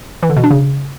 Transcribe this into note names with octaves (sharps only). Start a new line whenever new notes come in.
E3
D3
B2
D4
C#3